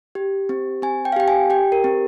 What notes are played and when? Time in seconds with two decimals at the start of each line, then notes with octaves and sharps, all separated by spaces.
0.15 G4
0.49 C4
0.82 C4 G#5
1.05 G5
1.12 F5
1.16 G4 G5
1.28 G#5
1.50 G4 G5
1.72 A#4
1.84 C4